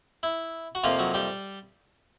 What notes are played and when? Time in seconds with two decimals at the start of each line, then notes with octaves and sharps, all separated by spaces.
0.23 E4
0.75 F#4
0.84 F2 C3 F3 A#3 F4
0.99 F#3 F#4
1.14 G3 G4